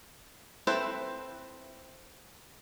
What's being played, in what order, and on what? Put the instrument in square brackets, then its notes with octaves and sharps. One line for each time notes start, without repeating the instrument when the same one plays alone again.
[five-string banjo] C4 E4 A4 B4 C5